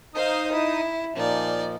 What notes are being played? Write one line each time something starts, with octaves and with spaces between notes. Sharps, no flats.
D#4 C5 F5 D#6
E4
A#2 F3 D#4 D5